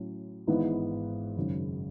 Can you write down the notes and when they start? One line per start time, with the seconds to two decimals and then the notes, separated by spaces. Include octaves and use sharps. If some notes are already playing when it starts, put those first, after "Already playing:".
Already playing: A2 F#3 C#4
0.47 G#1 G#2 E3 B3 E4
1.37 G#1 F#2 C#3